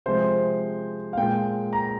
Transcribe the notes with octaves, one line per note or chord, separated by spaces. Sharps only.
C3 F3 G#3 C5
F5
A#2 G#3 G5
A#5